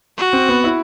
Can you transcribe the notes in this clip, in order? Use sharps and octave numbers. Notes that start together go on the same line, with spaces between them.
F#4
C4
B3
E4